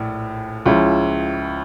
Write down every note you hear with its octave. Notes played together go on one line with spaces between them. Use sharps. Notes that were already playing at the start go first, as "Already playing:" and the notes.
Already playing: A#1 A2
C#2 C#3 F3 C#4 E4